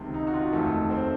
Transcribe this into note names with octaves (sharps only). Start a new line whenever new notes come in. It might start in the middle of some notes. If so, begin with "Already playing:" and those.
Already playing: C#2 C3 D#3
D#4
F#4
F4
F1 D#2 D#3 A3 A4
C4 C5